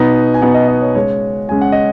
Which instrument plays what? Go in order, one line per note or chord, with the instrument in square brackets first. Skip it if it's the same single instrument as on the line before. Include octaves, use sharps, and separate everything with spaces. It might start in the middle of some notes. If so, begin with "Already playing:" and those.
Already playing: [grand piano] B2 B3 D#4
G#5
B2 B3 D#4 F#5
D#5
D#5
C#5
C#3 G#3 C#4 C#5
C#3 G#3 C#4 G#5
F#5
D#5